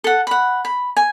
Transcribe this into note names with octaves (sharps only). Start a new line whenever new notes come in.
A4 F#5
F#5 B5
B5
G#5